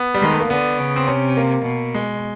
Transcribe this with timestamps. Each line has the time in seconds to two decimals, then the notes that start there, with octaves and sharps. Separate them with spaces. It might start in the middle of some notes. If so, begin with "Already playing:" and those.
Already playing: B3
0.14 G3
0.20 D#3 G#3
0.32 A3
0.41 A#3
0.50 D3 B3
0.79 C#3
0.96 C4
1.07 C3 C#4
1.37 A#3
1.66 B2
1.94 G#3